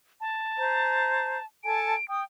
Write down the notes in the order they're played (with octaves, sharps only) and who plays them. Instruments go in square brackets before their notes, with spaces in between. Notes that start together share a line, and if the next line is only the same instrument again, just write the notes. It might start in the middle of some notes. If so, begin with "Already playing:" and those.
[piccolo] A5
[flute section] C5 A#5
[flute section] A4 G#5 A5 [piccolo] D7
[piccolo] G5 [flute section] D#6